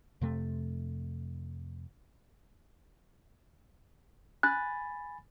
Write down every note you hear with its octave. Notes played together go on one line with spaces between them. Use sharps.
F2 C3 A3
G#5 B5 F#6 A6